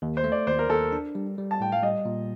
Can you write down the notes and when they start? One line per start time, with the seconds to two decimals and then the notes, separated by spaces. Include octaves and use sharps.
0.02 D#2
0.17 C5
0.24 A3
0.32 D5
0.47 D#2 C5
0.59 A#4
0.70 D#2 A4
0.92 D4
1.15 G3
1.38 G3
1.51 A5
1.60 A2 G5
1.72 F5
1.83 G3 D#5
2.05 A#2